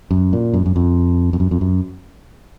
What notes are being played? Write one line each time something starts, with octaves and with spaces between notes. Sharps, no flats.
F#2
A#2
F#2
F#2
F2
F2
F#2
F2
F#2